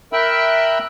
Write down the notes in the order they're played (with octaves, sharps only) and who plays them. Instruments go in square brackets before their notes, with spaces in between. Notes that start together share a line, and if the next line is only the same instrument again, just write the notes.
[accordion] A#4 E5 G5 B5 E6 F#6